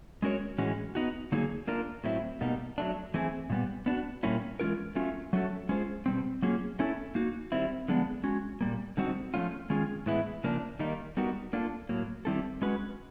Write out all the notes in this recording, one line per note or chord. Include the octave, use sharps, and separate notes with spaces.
G#3 C#4 F#4 A#4 C#5
A2 E3 G#3 C#4 F#4
B3 D#4 F#4
D3 F#3 A#3 D#4 G#4
A#3 D4 F4 A#4
A2 F#3 A3 C4 E4
B2 G3 A#3 D#4
F#3 A3 D4
E3 A3 C4 E4 G#4
A#2 G3 B3
B3 D4 F#4
A#2 G3 A#3 C#4 E4
E3 G#3 C#4 F4 A#4
F#3 A3 C#4 F4
F#3 A3 C#4 F#4 A4
G#3 C#4 F4 G#4 C5
B2 G3 C4
F#3 A#3 C#4 F4 G#4
A3 C#4 E4 A4
A#3 D#4 F#4
D#3 G3 C4 E4
D3 F3 G#3 B3 D4
G#3 C#4 F#4
A#2 G3 A#3
D3 G3 C4 D#4 F#4
F3 A3 C#4 F4
D#3 G#3 C#4 F4 G#4
A2 E3 G#3 B3 E4
C#3 F3 A#3 D4
D#3 G3 A#3 D#4
G3 B3 D#4 F#4 A#4
A#3 D4 F4 A4
A2 F#3 A#3
D#3 G3 C4 E4 A4
G#3 C#4 F#4 B4